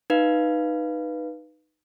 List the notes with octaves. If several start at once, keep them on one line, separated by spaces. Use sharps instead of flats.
D#4 B4 F5